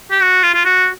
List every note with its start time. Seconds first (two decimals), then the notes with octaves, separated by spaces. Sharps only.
0.11 G4
0.22 F#4
0.43 F4
0.54 F4
0.65 F#4